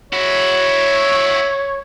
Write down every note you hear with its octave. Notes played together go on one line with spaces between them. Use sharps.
E4 F#4 C#5